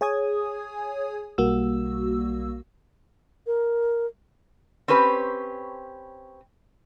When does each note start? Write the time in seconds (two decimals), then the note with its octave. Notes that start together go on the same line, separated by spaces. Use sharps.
0.01 G#4 C#5 G#5 D#6 G#6
1.38 B1 G3 A#3 F#4 E6
3.47 A#4
4.88 C4 C#4 G4 B4 C5